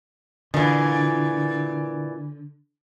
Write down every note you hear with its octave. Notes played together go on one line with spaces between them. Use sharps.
A#2 D3 E3